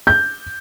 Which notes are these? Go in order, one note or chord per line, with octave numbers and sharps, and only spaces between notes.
G6